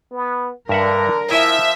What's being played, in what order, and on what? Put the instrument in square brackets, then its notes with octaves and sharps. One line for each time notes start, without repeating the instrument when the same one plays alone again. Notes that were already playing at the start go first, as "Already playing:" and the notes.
[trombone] B3
[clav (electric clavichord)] G2 E5 F#5 [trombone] D3 [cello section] A#4
[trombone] F3 [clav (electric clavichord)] E4 G#5 [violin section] E5